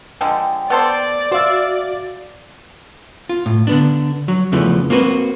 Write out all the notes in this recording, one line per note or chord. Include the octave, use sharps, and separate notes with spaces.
D3 F3 G#3 G5
B3 A4 C5 D5
F#4 C5 E5 F5
F4
A2
D3 B3 D4
F#3
E2 C#3 E3 F3 A3
A#3 C4 F#4 B4